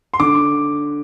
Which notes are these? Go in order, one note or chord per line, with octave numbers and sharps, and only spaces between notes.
C6
D3 D6